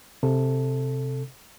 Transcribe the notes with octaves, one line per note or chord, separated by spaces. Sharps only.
C3 A4